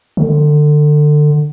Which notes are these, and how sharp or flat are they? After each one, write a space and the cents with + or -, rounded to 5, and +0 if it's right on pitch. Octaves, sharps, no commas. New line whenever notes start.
D3 +25